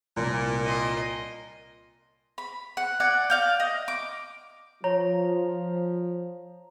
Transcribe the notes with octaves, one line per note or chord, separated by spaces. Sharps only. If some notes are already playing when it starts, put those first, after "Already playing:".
C2 A#2
D#5 C6
B5
F#5
D5 F#5 G#5
D5 F5 G6
D#5
D6
F3 C#5 A#5